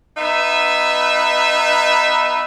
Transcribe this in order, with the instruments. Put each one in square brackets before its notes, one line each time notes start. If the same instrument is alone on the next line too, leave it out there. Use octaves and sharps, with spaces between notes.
[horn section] B3 D#4 B4 E5